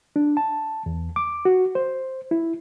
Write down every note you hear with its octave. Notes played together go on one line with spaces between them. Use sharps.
D4
A5
E2
D6
F#4
C5
E4